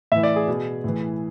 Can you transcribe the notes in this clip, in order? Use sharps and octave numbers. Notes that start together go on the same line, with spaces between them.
A2 E3 E5
D5
G#4
B2
A2 E3